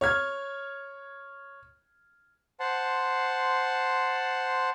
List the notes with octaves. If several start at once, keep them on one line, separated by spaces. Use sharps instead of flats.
C#5 F6 G#6
C5 F#5 A5 C6